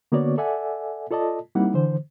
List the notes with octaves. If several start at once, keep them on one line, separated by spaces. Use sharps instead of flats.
D3 A#3 B3 F#4 C#5 D5
A4 D5 E5 F#5 G#5
F4 A4 D5 D#5 A5
G3 A#3 C4 D#4 E4 F#5
D3 E3 C5